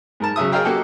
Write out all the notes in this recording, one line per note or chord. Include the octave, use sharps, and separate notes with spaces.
G#2 A#4 A5
C#3 F#3 E5 D#6
G#4 A#4 C#5 D#5 F5 G5
A#3 F#4 G4 A4